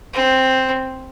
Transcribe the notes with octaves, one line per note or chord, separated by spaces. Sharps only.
C4